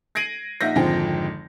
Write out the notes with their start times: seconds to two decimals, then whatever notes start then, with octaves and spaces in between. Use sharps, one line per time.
0.15 G#6 A#6 C7 D7 D#7 F#7
0.61 A#1 D#4 E5 F#5 G6 A#6
0.76 G#1 F2 D3 F3 G#3 G5